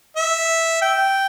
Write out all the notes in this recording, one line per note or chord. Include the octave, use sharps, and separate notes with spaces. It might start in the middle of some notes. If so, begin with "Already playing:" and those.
E5
G5